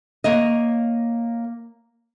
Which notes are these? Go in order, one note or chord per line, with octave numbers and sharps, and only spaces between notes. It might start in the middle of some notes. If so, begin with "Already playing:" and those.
A#3 C#5 D#5